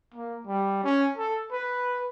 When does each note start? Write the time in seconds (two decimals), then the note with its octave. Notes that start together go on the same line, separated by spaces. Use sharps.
0.14 A#3
0.47 G3
0.84 C#4
1.17 A4
1.52 B4